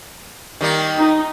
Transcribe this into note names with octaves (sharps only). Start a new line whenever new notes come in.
D#3 G3 A#3
D#4